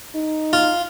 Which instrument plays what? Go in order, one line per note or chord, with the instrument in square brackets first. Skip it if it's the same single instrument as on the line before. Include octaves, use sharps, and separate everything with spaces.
[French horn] D#4
[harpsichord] F4